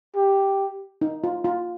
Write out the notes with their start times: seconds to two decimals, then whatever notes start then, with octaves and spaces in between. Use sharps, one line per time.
0.16 G4
1.01 D#4
1.24 F4
1.44 F4